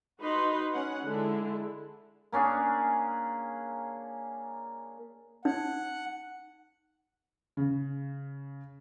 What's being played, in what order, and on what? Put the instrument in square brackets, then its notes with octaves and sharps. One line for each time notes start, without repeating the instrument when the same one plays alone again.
[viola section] D#4 F#4 B4 C6
C#4 F#5
D3 G#3 E4
[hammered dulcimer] A#3 C#4 D4 G#4
[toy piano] D#4 [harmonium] F#5
[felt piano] C#3